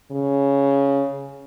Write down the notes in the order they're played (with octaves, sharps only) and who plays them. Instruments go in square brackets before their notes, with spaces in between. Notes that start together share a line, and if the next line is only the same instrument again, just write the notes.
[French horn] C#3